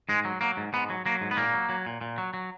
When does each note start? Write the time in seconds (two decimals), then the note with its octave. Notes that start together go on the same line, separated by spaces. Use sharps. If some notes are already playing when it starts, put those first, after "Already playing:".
0.09 G#2 G#3
0.25 F#3
0.41 F#3 A#3
0.57 G#2
0.73 G#2 B3
0.90 F#3
1.06 F#3 A#3
1.21 G#2
1.31 B3
1.37 A#2 A#3
1.54 F#3
1.69 F#3
1.87 A#2
2.01 A#2
2.18 F#3
2.34 F#3